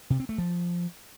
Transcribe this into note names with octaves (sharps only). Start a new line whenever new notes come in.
C3
C4
A3
F3